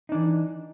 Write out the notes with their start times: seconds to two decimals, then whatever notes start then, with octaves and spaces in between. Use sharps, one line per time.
0.09 D#4
0.12 D4
0.15 E3